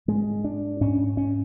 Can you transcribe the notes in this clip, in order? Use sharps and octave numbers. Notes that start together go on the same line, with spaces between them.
G#2 G#3
D4
G#2 C#4
C#4